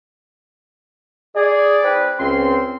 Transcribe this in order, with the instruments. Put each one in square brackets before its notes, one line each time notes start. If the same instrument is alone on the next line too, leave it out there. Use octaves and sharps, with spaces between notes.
[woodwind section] G#4 [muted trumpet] D5
[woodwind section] C4 E4 B4
[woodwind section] C#2 C#4 C6 [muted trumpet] C4